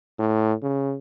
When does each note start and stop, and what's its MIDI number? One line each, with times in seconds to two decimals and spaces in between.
0.19 0.54 45
0.62 0.96 49